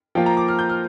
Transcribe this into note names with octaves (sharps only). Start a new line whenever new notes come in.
F3 A#3 F4 G5
A#5
D6
F6
G6
F6